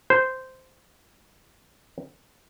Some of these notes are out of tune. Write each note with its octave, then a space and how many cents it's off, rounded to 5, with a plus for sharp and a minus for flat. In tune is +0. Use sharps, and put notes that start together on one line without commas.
C5 -10